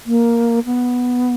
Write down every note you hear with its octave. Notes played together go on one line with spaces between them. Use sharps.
A#3
B3